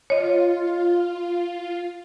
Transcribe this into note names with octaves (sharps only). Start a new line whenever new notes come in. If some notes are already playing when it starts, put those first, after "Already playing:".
F4 C#5 D#5